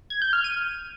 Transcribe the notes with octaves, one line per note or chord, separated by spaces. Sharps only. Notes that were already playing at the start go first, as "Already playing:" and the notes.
G#6
G6
F6
D#7